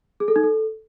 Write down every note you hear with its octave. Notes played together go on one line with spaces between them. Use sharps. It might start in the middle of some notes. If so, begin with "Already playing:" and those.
G#4
A4
D#4
A4